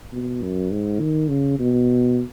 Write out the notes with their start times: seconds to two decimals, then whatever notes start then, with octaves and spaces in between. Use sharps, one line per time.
0.12 B2
0.42 F#2
0.71 G#2
1.00 D#3
1.30 C#3
1.59 B2